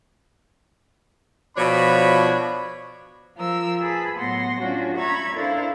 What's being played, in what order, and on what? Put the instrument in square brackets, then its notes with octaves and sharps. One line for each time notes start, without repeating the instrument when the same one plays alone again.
[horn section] B2 F3 D4 C#5 B5
[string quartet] F3 A#4 E6
G#4 B4 A5 B5
A2 F#3 B3 F#5 C6 A#6
C#4 D4 F4 F#4
E5 A#5 B5 C#6 G#6
D4 E4 A4 A#4 C5 F5